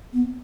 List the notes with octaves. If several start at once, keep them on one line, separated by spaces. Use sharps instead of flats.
B3